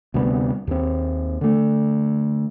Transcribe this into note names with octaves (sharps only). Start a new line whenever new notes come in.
D2 C3 G3 B3
D#2 C4
D3 A3